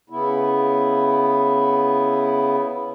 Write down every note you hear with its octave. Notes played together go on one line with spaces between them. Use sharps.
C#3 B3 E4